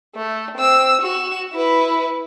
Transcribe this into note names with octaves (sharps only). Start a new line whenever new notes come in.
A3
C4 E6
F#4 E7
E4 B4